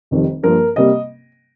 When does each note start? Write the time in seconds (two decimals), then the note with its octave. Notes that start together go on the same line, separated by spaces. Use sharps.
0.11 F1 F2 D#3 G3
0.43 G2 F3 A#3 A#4
0.76 C3 G3 A#3 D#5